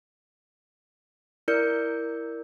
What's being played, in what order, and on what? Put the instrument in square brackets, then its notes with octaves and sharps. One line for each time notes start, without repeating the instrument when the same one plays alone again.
[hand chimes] E4 A#4 D5 G6 C#7